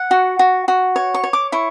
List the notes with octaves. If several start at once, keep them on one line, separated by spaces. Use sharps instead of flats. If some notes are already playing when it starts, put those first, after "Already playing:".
Already playing: F#5
F#4
F#4
F#4
C#5
C#6
C#5
D6
E4 C#6